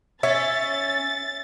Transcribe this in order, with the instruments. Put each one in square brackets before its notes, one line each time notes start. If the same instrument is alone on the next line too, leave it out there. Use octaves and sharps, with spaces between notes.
[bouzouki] C#4 [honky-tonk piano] E5 [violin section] A6